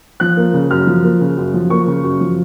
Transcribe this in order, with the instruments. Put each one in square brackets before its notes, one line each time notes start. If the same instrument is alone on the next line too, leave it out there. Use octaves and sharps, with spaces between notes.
[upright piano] F3 F#6
A#3
C#3
F#2 F6
F3
A#3
C#3
F#2
F3
A#3 C#6
C#3
F#2
F3